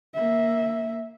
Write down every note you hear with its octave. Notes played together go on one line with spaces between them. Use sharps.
A#3 E5